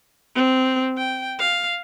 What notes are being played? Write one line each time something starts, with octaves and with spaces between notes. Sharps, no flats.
C4
G5
F5